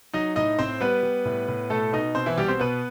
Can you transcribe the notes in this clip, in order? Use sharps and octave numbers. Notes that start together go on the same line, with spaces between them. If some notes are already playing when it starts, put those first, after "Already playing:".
F#3 D#4 D#5
A2 D#4 D#5
A2 C4 C5
G3 B3 B4
G3
A2
A2
B2 A3 A4
B2 D#4 D#5
B2 C4 C5
E3 E4
B2 G3 G4
C4 C5
B2 B3 B4